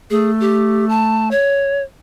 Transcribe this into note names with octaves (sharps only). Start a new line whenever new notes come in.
A3 G#4
G4
A5
C#5